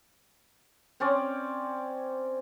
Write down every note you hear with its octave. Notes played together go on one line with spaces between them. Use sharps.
C4 C#4 D5